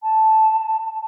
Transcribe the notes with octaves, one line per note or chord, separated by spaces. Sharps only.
A5